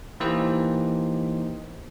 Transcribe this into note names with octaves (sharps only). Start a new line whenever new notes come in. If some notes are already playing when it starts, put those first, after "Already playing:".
E3 A#3 D#4 G4 C5 D#5